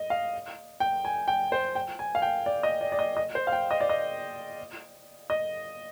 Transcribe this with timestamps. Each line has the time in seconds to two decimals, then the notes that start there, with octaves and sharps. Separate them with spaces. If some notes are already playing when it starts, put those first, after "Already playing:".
Already playing: D#5
0.10 F5
0.80 G5
1.05 G#5
1.28 G5
1.52 C5
1.75 G5
1.99 G#5
2.15 F5
2.22 G5
2.46 D5
2.63 D#5
2.81 D5
2.92 D5
2.99 D#5
3.17 D#5
3.35 C5
3.47 F5
3.52 G5
3.71 D#5
3.81 D5
3.89 D#5
5.30 D#5